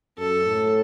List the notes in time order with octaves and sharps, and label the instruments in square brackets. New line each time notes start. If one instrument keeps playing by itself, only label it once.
[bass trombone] F#2 [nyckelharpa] A4
[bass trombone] A2